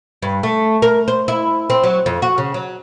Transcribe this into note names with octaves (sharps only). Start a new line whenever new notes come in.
G2
A3
A#4
C5
E4
C4
F#3
F2
F#4
C#3
F#3